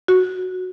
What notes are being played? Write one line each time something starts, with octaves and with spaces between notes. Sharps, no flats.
F#4